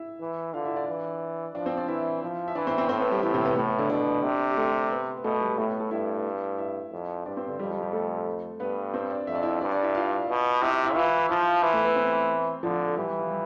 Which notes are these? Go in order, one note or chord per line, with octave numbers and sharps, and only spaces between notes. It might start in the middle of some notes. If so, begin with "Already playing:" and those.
Already playing: E4 E5
E3
D3 F4 F5
E4 E5
D4 D5
E3
F3 D4 D5
C4 C5
D4 D5
E3 E4 E5
F3
E5
E3 D4 D5
C4 C5
C4 C5
A2 C4 C5
B3 B4
G3 G4
A2 E3 E4
C3 C4
B3
A2 A3
B3
D3 D4
B2 D3 D4
C3
G4
A3 A4
B3 B4
B4
B2 A3 A4
G3 G4
A2 A3 A4
B3 B4
A3 A4
G2 E4 E5
E4 E5
F2
G2 D4 D5
C4 C5
D3 D4
F2 G3 G4
G3 G4
G3 G4
A3 A4
G2 B3 B4
C4 C5
D4 D5
F2 E5
D5
E4 E5
G2 D4 D5
D4 D5
E4 E5
F4 F5
B2
C3 E4 E5
E4 E5
E3 F4 F5
E5
F3 F4 F5
E3 E4 E5
A3 A4
B3 B4
C4 C5
D3 F3 F4
A4
E3 G3 G4
G3 G4
F3 F4
G3 G4